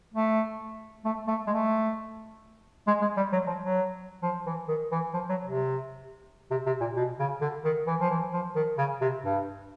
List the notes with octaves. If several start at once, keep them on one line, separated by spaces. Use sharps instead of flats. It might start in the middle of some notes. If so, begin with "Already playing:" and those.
A3
A3
A3
G#3
A3
G#3
G#3
G3
F#3
F3
F#3
F3
E3
D#3
E3
F3
F#3
C3
C3
C3
A#2
B2
C#3
D3
D#3
E3
F3
E3
F3
D#3
C#3
C3
G2